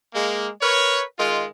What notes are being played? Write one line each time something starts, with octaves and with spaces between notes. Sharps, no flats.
G#3 A#3
A#4 B4 C#5
D#3 G#3 F4